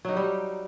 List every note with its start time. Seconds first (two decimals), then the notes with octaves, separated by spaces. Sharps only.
0.05 F#3
0.09 D#4
0.13 G4
0.17 G3